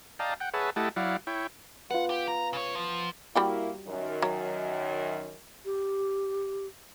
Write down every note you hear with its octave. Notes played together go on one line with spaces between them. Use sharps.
D5 D#5 F5 G5 A5 A#5
F#5 G5
G#4 B4 C#5 E5 F#5 A5
A3 E4 G4 D#5 F#5 A5
F#3 E4 D5 F5 F#5
E4 C#5 G5
B3 F4 F#5
G4
A#5
C#3 C#5
F3
G3 A#3 E4 F#4 G4
F#2 D#3
F#3
G4